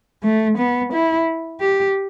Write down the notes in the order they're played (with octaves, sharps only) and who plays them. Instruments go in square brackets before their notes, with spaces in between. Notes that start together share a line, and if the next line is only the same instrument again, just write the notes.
[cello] A3
B3
E4
G4